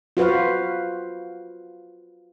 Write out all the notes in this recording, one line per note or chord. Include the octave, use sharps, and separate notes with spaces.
F4 F#4 B4 C5 F5